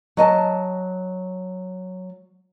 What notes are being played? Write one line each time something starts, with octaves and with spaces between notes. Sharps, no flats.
F#3 D#5 G#5 A5